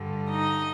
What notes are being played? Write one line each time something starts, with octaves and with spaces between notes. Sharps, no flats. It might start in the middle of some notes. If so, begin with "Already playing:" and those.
Already playing: G2 D3 G3
D#4 D#5